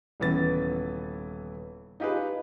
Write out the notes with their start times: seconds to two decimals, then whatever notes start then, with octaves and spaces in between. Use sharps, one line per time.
0.20 D#1 C#3 E3 B3 A6
2.00 D#4 F4 G4 G#4 B4